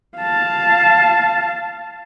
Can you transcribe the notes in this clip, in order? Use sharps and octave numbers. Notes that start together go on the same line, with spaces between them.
F5 A5